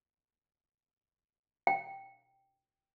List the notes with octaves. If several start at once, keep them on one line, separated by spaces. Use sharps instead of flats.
G5